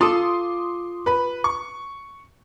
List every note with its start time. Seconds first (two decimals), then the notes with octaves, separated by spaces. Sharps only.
0.01 F4 A4 C6 D6 D#6
1.06 B4 B5
1.44 C#6